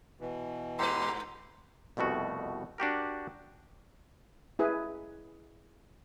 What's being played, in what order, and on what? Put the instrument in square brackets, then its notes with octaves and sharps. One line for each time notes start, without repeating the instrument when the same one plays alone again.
[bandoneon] B2 E3
[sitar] G2 B4 [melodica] G4 A#5 E6 [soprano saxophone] C6
[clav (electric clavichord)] C2 F2 B2 A3 F#4
D4 F#4 G4 A#4
[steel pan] E4 G#4 B4